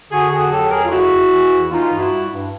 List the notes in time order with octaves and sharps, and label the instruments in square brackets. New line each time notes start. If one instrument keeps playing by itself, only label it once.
[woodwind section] D3 F#4 G#4
F2 F#4 G#4
F#3 G4 A4
F2 G#4 A#4
F4
C#3 E4 F#4
E2
E3
E2
E3 D#4 F4
G2
E4 F#4
G3
G2